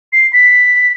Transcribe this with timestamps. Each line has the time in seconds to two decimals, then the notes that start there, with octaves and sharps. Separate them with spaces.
0.13 C7
0.33 B6